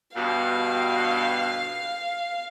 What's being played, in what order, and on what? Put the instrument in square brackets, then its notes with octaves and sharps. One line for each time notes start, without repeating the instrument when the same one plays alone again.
[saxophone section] G2 B2 [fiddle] F5